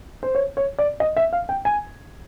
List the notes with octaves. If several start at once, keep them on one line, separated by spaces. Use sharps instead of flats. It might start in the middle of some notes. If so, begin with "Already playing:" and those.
C5
C#5
C#5
D5
D#5
E5
F5
G5
G#5